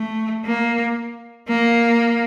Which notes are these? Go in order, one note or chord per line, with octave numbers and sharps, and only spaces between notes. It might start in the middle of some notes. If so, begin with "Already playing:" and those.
Already playing: A3
A#3
A#3